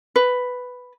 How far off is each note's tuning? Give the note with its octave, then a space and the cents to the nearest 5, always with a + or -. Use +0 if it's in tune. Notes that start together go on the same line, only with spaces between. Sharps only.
B4 +5